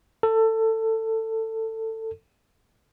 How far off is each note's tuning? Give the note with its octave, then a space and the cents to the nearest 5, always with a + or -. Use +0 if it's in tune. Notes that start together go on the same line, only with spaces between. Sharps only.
A4 +20